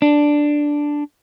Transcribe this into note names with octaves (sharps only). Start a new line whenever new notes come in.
D4